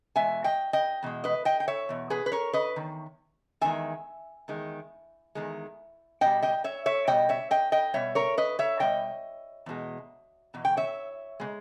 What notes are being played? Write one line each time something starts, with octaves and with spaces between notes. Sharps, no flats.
E2 B2 G#3 E5 G#5
D#5 G5
D#5 G5
E2 B2 G#3
B4 D#5
D#5 G5
G5
C#5 E5
E2 B2
G#4 B4
B4
A#4 C#5
B4 D#5
E2 D#3
E2 D#3 G#3 E5 G#5
E2 D#3 G#3
E2 D#3 G#3
B2 G3 D#5 G5
D#5 G5
C#5 E5
C#5 E5
B2 G3 D#5 G5
C#5 E5
D#5 G5
D#5 G5
B2 G3 C#5 E5
A#4 C#5
B4 D#5
C#5 E5
B2 G3 D#5 G5
E2 B2 G#3
E2 B2
G5
C#5 E5
B2 G#3